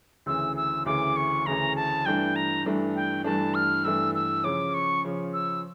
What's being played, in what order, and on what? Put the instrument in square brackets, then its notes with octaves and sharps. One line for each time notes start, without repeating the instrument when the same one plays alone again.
[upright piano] D2 C#3 E3 [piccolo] E6
[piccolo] E6
[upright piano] D2 C#3 E3 [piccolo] D6
[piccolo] C#6
[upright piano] D2 C#3 E3 [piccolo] A#5
[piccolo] A5
[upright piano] G2 E3 A3 D4 [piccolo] G5
[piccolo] A#5
[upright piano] G2 E3 A3 D4
[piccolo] G5
[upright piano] G2 E3 A3 D4 [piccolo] A5
[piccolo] F6
[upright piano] G2 E3 A3 D4 [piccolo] E6
[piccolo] E6
[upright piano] C#3 F3 C#4 [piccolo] D6
[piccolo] C#6
[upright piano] C#3 F3 C#4
[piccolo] E6